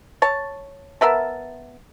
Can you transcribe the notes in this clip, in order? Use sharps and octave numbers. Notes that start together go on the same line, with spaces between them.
C#5 A5
B3 A#4 E5 A5